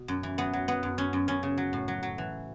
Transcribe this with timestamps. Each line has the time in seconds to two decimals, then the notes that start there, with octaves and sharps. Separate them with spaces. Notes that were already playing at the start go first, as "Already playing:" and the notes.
Already playing: B2
0.08 F#2
0.23 E3
0.38 F#3 B3
0.53 F#3
0.68 F#3 B3
0.83 F#2
0.98 F#2 C#4
1.13 F#2
1.28 F#2 C#4
1.43 C#3
1.58 F#3
1.73 A2
1.88 F#3
2.03 F#3
2.18 E3